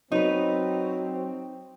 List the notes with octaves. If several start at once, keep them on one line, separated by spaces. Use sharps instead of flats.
F#3 C4 D#4 B4